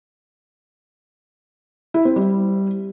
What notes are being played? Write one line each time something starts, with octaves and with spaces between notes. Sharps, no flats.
E4
C4
G3